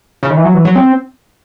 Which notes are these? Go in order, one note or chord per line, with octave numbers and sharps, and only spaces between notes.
C#3
D#3
E3
F#3
E3
F#3
C4